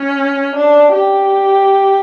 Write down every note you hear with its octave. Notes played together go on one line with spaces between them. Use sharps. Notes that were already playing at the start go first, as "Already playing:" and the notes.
Already playing: C#4
D4
G4